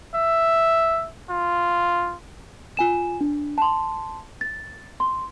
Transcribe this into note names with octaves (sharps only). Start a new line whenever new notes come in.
E5
F4
F4 G#5 E7
D4
A5 C6
A6
C6